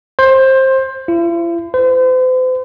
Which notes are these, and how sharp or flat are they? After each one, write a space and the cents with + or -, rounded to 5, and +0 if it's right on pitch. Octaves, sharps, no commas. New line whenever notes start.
C5 +20
E4 +45
C5 -40